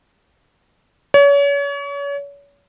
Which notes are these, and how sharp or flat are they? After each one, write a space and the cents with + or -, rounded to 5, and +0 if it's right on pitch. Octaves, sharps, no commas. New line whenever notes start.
C#5 +35